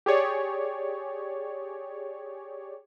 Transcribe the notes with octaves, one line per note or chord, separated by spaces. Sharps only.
G4 G#4 C#5 D5